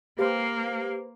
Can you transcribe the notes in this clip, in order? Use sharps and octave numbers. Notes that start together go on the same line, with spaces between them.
A#3 G4 B4 C5 F5